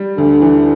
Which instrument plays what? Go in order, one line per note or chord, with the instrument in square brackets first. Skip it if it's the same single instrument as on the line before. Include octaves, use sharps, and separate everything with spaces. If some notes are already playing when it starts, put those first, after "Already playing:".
Already playing: [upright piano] G3
[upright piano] D2 [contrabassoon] D3
[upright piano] E3